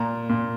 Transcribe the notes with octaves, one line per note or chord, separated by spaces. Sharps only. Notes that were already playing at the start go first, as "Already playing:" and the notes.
Already playing: A#2 A#5
A#2